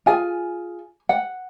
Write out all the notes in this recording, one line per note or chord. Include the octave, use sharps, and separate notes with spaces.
F4 G#4 G#5
F#5